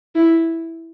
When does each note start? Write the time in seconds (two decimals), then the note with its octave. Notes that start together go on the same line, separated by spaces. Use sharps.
0.15 E4